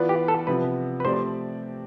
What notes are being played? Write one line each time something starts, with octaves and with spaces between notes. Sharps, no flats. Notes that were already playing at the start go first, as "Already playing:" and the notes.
Already playing: E3 B3 F4 B4 D5
G4
A4
C3 F3 B3 B4
B4
F3 A3 C4 G4 C5 D5